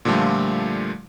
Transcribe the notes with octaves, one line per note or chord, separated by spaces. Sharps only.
A#2 D3 F3 G3 A3 F4